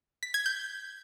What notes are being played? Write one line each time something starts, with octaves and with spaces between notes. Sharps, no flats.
B6
G#6
G6